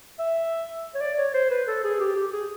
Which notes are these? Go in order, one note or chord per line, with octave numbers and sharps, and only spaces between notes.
E5
C#5
D5
C#5
C5
B4
A4
G#4
G4
G4
G#4